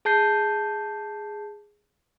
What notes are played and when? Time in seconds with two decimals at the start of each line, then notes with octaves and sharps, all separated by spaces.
0.05 G#4 A5 G6 C7